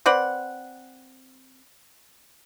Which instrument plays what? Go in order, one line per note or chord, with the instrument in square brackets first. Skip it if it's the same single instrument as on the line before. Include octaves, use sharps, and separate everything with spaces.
[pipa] C4 B4 D5 F#5